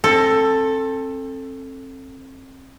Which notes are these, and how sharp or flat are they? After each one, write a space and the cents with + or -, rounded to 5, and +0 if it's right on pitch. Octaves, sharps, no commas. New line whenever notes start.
C4 +35 A4 +10